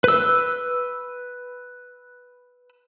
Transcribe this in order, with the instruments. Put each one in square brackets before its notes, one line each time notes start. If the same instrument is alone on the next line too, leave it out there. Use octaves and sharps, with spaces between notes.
[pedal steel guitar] B4 E6